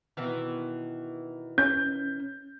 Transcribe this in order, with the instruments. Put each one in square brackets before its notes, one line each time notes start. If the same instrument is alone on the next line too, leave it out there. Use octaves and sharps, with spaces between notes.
[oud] B2 D#3 E3
[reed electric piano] C#4 [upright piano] G6